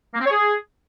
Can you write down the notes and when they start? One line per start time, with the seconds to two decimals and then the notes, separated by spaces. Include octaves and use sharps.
0.14 A#3
0.20 C4
0.25 C#5
0.31 G#4